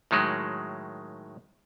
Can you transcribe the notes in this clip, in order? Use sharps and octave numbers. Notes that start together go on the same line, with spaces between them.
A2 D#3 F#3 G#3